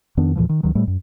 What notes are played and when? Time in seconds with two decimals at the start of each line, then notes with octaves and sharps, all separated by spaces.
0.17 F2 D#3 B3 D4
0.36 E2 A#2 E3 F3
0.49 D#3
0.63 D2 D#3 F#3
0.75 A2 G3 A3
0.87 F#2